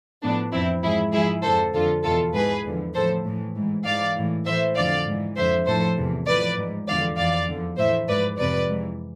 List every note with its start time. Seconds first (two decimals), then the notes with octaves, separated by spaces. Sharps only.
0.22 A2 F3 B3 D4
0.52 F2 E3 C4 E4
0.82 G#2 F3 E4 G#4
1.12 G#2 F3 E4 G#4
1.43 F2 D3 F3 A4 C5
1.74 F2 D3 F3 F4 A4
2.03 E2 B2 F4 A4
2.34 G#2 E3 G#4 B4
2.64 E2 D3 F3
2.94 A2 F3 A4 C5
3.25 A2 E3
3.55 G#2 E3
3.84 G#2 E3 D5 F5
4.16 A2 E3
4.45 A2 E3 C5 E5
4.75 F2 D3 F3 D5 F5
5.06 G#2 E3
5.37 F2 D3 F3 C5 E5
5.66 A2 F3 A4 C5
5.97 E2 C3 E3
6.26 A2 F3 B4 D5
6.57 G#2 F3
6.87 E2 D3 F3 D5 F5
7.17 F2 E3 D5 F5
7.48 E2 D3 F3
7.77 A2 E3 C5 E5
8.08 G#2 F3 B4 D5
8.38 F2 C3 F3 B4 D5
8.69 G#2 E3